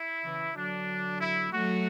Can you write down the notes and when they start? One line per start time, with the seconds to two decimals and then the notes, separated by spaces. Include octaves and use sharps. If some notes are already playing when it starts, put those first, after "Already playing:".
Already playing: E4
0.24 C#3 E3
0.56 D3 F#3 D4
1.19 E4
1.52 F#3 A3 F#4